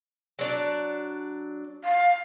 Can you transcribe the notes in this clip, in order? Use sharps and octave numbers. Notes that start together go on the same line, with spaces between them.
F#3 D4 D5
F5